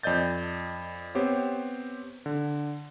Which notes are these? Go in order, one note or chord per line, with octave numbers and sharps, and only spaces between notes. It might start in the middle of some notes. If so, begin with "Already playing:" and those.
F2 D5 D#5 G6 A6
B3 C4 G4 C5 C#5
D3